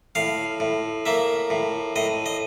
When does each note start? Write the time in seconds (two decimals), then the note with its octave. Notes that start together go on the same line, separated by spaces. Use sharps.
0.15 A2 F5
0.60 A2
1.06 A#3 E5
1.50 A2
1.96 A2 D#5
2.26 D#5